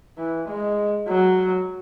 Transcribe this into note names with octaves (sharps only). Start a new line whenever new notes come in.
E3
G#3
F#3